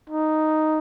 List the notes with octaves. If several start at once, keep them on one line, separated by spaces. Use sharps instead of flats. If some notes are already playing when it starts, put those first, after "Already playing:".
D#4